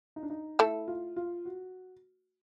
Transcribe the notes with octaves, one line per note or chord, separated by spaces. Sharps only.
D#4
D4
D#4
A3 E4 A4
F4
F4
F#4